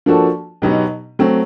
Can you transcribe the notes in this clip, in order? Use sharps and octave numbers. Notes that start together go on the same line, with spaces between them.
F3 A#3 D4 F#4 A4
B2 F#3 B3 D#4 G4
F#3 A3 C4